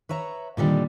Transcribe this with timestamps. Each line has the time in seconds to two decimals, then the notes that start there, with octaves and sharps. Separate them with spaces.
0.09 B4 C#5 E5 A#5
0.57 A#2 D3 D#3 G3